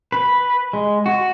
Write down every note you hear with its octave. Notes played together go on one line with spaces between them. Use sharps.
B4
G#3
F#4